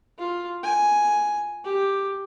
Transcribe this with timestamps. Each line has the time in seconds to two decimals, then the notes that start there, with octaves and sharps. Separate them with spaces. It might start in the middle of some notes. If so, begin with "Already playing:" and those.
0.19 F4
0.63 G#5
1.64 G4